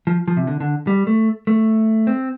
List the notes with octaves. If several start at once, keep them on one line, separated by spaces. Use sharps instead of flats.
F3
F3
C3
D3
D3
G3
A3
A3
C4